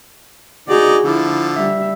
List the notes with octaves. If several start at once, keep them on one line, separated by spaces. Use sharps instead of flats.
D#4 F#4 G#4 D5
D3 F3 E4
G3 E5